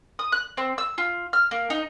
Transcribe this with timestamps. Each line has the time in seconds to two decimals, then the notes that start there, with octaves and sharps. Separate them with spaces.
0.19 D#6
0.32 F#6
0.57 C4
0.78 E6
0.98 F4
1.33 F6
1.51 A#3
1.70 D#4